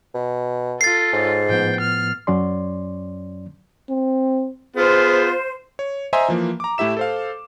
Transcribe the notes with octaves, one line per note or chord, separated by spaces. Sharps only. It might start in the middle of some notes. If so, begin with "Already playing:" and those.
B2
F4 A4 A6 C7
G#2 G#4 C#5 D#5
A2 F3 B3 G5
F6
F#2 F#3 C#4 D5 C6
C4
B3 F4 G#4 C5
C#5
C5 D#5 E5 G#5 A#5 C6
E3 F3 A#3
A#5 D6
A2 A3 E4 G4 E5 E7
A4 C5 F5